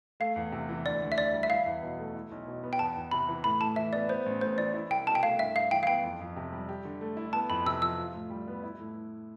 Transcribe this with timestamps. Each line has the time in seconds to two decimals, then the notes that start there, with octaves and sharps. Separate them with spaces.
0.20 A3 F5
0.36 E2
0.52 C3
0.69 E3
0.85 D2 D5
1.02 D2
1.12 E5
1.17 D3 D5
1.34 G3
1.43 E5
1.50 E4 F5
1.66 E2
1.83 B2
1.99 A3
2.15 E4
2.32 B1
2.47 B2
2.63 B3
2.73 G5
2.79 E2 A5
2.96 E2
3.11 C3 B5
3.28 E3
3.44 A2 B5
3.61 A2 A5
3.76 E3 E5
3.93 B3 D5
4.09 B3 C5
4.26 A1
4.41 A2 C5
4.57 E3 D5
4.74 E4
4.90 C2 G5
5.06 B2 A5
5.15 G5
5.23 A3 F5
5.39 G2 E5
5.55 G2 F5
5.71 E3 G5
5.83 F5
5.87 B3 G5
6.03 F2
6.20 F2
6.36 C3
6.53 G3
6.69 G4
6.85 D3
7.01 A3
7.17 E4
7.33 B3 A5
7.50 F2 B5
7.66 C3 E6
7.82 F3 E6
7.98 F4
8.14 A2
8.30 G3
8.48 B3
8.64 E4
8.80 A2